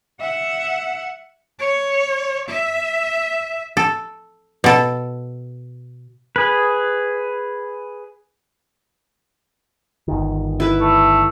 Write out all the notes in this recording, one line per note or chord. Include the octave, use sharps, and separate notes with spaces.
E5 F#5
C#5
E5
A4
B2 A4
G#4 B4
G1 D#3
E4 B4
A3